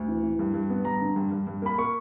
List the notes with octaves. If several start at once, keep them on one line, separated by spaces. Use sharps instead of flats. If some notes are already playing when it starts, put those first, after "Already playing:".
Already playing: D2
E3
E3
G2
G2
B3
G2 A#5
D3
G2
G2
G2
A#3 B5
A#3 C#6